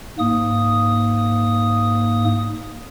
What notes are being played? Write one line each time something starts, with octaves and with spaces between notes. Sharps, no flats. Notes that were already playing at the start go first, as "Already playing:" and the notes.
G#2 A#3 D#6